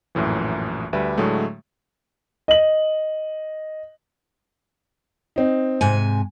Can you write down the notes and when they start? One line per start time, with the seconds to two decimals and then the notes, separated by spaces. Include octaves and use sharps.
0.15 A#1 F#2 A2 E3
0.93 D2 G3 B4 E5
1.18 A2 D3 F#3 G#3 A3
2.48 D#5 F#7
5.36 C4 D#4
5.81 G#2 C3 G#5